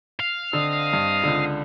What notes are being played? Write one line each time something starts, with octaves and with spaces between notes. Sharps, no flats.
F5
D3 C4 D#5 D#6
G2
C#2 D3